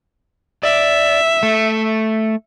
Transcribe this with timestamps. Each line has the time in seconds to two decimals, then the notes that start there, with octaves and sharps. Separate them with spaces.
0.63 D5 E5
1.43 A3